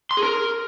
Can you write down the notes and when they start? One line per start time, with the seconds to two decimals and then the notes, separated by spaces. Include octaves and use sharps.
0.11 C6
0.17 G#4
0.23 A#4